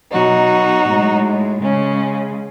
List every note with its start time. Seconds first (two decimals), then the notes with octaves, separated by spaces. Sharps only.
0.11 B2 F#3 D#4 F#4
0.86 A2 G#3
1.61 C#3 G#3 C#4